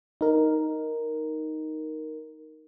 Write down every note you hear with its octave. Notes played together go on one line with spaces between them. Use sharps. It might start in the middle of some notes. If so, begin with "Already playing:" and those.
D#4 A#4